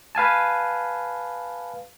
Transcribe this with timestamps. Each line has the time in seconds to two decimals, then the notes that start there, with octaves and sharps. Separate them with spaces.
0.15 B4 F5 G#5 A5